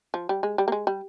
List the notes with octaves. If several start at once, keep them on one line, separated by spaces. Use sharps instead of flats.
F3
G3
G#3
G3
A#3
G#3
G3